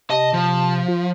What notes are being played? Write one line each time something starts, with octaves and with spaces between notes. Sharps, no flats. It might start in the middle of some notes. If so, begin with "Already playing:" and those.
C3 D#5 A5
F3
F4